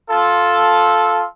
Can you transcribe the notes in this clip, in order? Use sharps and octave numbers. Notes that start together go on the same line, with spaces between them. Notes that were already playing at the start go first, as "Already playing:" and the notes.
F4 A4